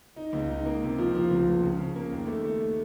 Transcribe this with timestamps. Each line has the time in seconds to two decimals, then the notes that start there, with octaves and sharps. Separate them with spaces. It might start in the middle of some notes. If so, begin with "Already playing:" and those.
0.16 D#4
0.33 C#2
0.49 D#4
0.66 A#3
0.82 C3
0.98 F3
1.15 F3
1.31 C#2
1.47 C#2
1.63 C#3
1.79 C#3
1.96 A#3
2.12 D#2
2.28 A3
2.44 A3